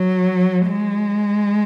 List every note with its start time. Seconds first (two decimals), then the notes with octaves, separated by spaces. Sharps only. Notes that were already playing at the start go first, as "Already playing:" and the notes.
Already playing: F#3
0.66 G#3